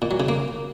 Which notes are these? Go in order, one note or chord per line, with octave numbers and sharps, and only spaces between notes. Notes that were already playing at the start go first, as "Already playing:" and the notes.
A#2
F#3
C#3
A#3